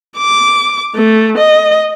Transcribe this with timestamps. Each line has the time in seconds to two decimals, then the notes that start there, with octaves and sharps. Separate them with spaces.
0.18 D6
0.95 A3
1.37 D#5